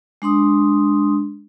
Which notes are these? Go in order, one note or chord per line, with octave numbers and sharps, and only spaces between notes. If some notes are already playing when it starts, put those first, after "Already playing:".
G#3 D4 C6 D#6